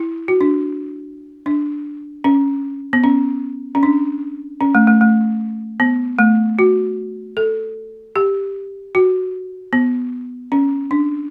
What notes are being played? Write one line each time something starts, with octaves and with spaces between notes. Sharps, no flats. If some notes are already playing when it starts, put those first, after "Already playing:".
Already playing: E4
F#4
D4
D4
C#4
B3
C#4
C#4
D4
C#4
A3
A3
A3
B3
A3
F#4
A4
G4
F#4
B3
C#4
D4